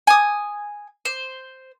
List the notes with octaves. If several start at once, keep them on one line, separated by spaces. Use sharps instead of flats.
G#5 D#6
C5